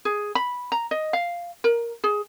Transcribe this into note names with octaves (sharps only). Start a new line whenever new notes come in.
G#4
B5
A#5
D#5
F5
A#4
G#4